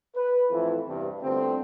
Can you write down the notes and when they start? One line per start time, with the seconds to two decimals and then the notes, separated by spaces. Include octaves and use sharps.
0.15 B4
0.51 F2 A2 E3 E4
0.86 E2 G2 C3
1.22 G1 D2 G2 D3 C4